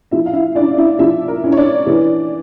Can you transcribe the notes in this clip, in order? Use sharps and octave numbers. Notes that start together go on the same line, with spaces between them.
F3 E4 E5
F5
E4 E5
C#4 D4 E4 D5
E4 E5
F3 E4 E5
A#4
C#4 E4
C#5
D4 D5
E3